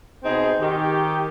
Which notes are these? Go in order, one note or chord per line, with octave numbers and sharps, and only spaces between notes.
B2 C4 D#4 G#4
D#3 G4